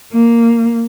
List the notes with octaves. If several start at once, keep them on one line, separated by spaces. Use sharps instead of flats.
A#3